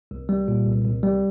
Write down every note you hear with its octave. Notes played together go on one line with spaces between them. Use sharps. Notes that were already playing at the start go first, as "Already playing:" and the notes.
C2
G3
A#2
C2
C2
G3